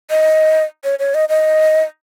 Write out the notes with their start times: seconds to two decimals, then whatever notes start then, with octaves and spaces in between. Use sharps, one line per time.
0.10 D#5
0.84 C#5
0.99 C#5
1.14 D#5
1.29 D#5